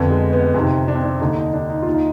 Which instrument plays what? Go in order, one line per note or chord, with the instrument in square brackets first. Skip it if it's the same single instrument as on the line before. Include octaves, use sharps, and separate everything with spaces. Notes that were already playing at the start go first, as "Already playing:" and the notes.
Already playing: [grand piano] F2 D3 B3
G#3
B3
F2 C3 D#3 C4
D4
C4
D4
D#2 D3 D#4
D#4
D4
D#4
D#2 D#3 F4
D#4